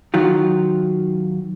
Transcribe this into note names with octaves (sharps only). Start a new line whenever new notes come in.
D#3 F#3 F4